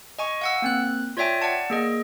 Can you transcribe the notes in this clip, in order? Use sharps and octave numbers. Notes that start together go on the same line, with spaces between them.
D#5 G#5 C#6
F5 F#5 E6
A#3 C4 F#6
F4 C#5 D5 E5 G5 G#5
D5 F#5 A5
A#3 G#4 D#5